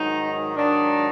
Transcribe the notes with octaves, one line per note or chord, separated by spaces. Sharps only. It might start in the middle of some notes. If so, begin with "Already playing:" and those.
Already playing: G#2 D#3 F#3 D#4
G#2 D#3 F#3 D4